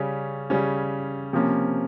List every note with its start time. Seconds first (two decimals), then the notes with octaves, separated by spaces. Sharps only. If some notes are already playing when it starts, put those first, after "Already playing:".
Already playing: C#3 G3 C#4
0.50 C#3 G3 C#4
1.33 C3 F3 A#3 C#4